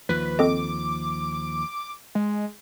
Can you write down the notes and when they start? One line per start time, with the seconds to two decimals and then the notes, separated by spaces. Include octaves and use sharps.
0.09 D#2 F3 B4
0.39 C4 A4 D#5 D6
2.15 G#3